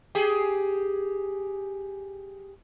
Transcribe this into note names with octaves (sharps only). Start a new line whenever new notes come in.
G4 G#4